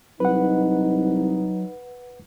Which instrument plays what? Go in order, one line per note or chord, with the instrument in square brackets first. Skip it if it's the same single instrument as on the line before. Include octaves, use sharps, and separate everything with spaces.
[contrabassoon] C2 [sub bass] F#3 [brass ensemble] D#4 [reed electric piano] B4 F#5